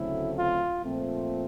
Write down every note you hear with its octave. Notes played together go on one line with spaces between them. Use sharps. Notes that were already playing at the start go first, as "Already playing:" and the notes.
Already playing: D2 C#3 F#3 A3 C4 E4
F4
A#2 F3 A3 C4